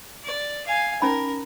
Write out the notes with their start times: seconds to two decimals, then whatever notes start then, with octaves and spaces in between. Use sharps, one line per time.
0.24 D5
0.67 F5 G#5
1.02 C#4 D#4 A#4 B5